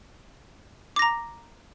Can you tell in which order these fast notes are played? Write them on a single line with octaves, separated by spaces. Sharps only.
D6 A#6 A#5